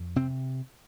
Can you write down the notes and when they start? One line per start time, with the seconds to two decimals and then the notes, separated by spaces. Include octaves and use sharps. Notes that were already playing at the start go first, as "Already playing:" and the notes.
Already playing: F2
0.16 C3 C4